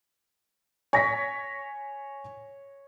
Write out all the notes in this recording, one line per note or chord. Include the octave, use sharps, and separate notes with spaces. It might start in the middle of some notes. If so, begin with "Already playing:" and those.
C#5 G#5 A#6 B6